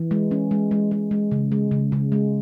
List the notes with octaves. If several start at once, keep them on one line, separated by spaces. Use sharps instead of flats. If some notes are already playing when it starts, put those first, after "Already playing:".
Already playing: E3
G#3
C#4
G#3
G#3
G#3
G#3
C#3
G#3
C#3
C#3
G#3